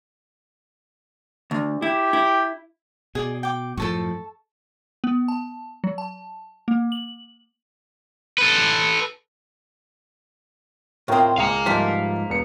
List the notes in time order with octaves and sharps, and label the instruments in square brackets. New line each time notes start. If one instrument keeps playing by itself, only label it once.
[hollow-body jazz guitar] D2
[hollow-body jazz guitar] E4 [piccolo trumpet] G4
[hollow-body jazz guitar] E4
[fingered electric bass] B2 [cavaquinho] G#4 D5
[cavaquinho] G5 D6
[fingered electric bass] F#2 A2 F3 [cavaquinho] A4 A5 C#6
[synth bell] B3
A5
F#3
A5
A#3
F#7
[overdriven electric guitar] A4 B4
[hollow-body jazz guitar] A2 C4 [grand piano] F4 A#4 D#6
[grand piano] C#2 G#4 C#7 [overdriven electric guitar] F5 A#5
[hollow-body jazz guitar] G#2 F3 [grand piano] G3 A5 B6
[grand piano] E1 B3 C#7